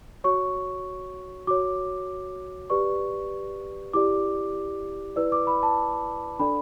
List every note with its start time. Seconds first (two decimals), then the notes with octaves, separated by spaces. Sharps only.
0.24 F#4 C#5 C#6
1.47 F#4 C#5 D6
2.70 G4 B4 D5 C#6
3.93 E4 G4 D5 D6
5.16 E4 B4 D5 E6
5.32 D6
5.47 B5
5.63 A5
6.39 D4 A4 D5 B5